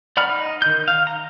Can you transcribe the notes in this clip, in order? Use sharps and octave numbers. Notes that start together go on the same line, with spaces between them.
D5 F#5 A#5 B5 F6
D#4
D#3 G6
F5
A#5